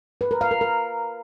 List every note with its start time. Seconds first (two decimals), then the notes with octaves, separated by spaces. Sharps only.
0.21 B4
0.31 A#4
0.41 F5
0.51 A#4
0.61 A#4